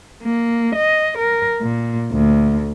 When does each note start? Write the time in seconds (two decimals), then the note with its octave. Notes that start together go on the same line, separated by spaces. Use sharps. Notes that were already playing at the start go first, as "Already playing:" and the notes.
0.23 A#3
0.76 D#5
1.18 A#4
1.62 A#2
2.13 D2